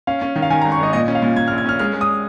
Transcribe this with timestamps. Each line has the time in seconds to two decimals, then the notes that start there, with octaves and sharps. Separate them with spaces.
0.07 C#4 F5
0.22 C#4
0.36 D#3
0.42 F5
0.50 D#3 G#5
0.62 A#5
0.65 G#1
0.72 C#6
0.79 G#1 D#5
0.93 A#2 D#5
1.08 C#4
1.15 F5
1.22 A#2
1.36 A#2 G#6
1.48 F6
1.51 A#1
1.58 G#6
1.66 C#4 F6
1.79 G#3 F6
1.94 G#3
2.01 D#6